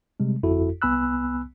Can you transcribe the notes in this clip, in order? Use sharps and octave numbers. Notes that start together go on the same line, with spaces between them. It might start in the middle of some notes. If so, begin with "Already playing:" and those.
C3 G3 G#3
G1 F2 E4 F#4 A4
C2 B3 G#5 B5 E6 F#6